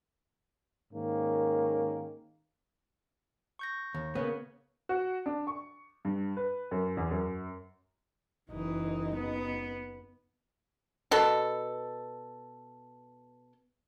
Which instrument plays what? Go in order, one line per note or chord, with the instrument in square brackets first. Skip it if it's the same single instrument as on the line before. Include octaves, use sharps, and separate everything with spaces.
[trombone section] G#2 D#3 A#3 C#4
[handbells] C#6 G6 A#6
[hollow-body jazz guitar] D#2
[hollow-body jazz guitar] C#3 [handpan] A#3 C#5 [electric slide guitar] B3
[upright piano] F#4
D4
C#6
G2
B4
F#2
E2
F#2
[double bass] F#1 D#4 [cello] E3
[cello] B3
[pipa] B2 A4